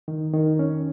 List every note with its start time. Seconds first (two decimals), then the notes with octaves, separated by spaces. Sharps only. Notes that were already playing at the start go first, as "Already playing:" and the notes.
0.08 D#3
0.33 D#3
0.59 C#4